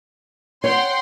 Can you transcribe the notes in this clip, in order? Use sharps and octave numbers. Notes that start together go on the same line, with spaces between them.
C#5 F#5 G5 C6